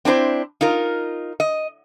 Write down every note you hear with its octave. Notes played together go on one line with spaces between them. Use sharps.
C4 D4 E4 C5
D#4 F4 A#4
D#5